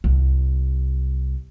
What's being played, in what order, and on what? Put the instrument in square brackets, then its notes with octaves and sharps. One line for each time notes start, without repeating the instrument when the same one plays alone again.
[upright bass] C2